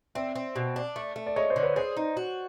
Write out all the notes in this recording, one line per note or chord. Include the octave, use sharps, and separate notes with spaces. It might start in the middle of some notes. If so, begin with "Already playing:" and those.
C4 D5 E5
C4
B2
D4
A3
A3
D5
G#3 C#5 D#5
C5 D5
D3
B4 C#5
G#4 C5 D5
D#4
F#4